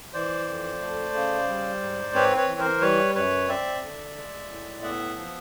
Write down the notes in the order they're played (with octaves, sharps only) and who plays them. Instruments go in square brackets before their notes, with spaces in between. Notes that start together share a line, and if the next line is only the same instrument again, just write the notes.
[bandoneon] E3 C5 D5
F2
A3
C#3
G3
G#2
C4 B4 C#5
B4 C#5
E3
A#4 C5
G3 B4 C#5
F#2 B4 C#5
C4 D5 E5
D3
G#3
A2
B3 E5 F#5
F3